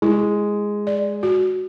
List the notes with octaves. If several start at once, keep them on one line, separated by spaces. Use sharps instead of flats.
G#3 E4
D5
F#4